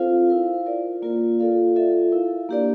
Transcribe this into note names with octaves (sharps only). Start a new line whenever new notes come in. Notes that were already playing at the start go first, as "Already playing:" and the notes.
Already playing: C4 F4 A4 C5 F5
E4 A#4 F5
F4 A#4 D5
A#3 F4 A#4 D5
F4 A4 D5 F5
F4 A4 E5
E4 A#4 F5
A#3 D4 G4 A#4 D5